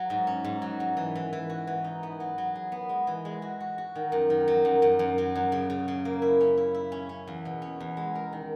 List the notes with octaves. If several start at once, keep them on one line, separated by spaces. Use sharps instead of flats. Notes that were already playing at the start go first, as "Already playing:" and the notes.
Already playing: F#3
G#2
C#4
G#2
F#3
G#2
E3
E3
E3
F#4
E3
D#4
B3
F#3
F#3
G#4
B3
G#3
E3
G#3
F#4
F#4
F#4
D#3
F#2
D#3
F#3
F#2
F#2
F#2
F#3
F#2
C#3
C#3
C#3
A#3
E4
C#4
E4
E4
C#4
C#4
E2
B2
C#4
E2
G#3
A#4
D#3